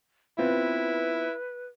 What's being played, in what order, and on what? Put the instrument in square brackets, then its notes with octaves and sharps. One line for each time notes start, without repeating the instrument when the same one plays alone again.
[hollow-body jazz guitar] B3 C4 F4 [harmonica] E4 [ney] B4